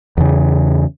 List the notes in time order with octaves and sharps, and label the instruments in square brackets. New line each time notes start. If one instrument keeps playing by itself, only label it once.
[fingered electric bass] E2 C#3